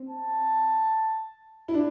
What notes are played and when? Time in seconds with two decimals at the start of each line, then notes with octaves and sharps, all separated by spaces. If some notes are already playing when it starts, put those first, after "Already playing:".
Already playing: C4
0.09 A5
1.68 E4
1.74 D4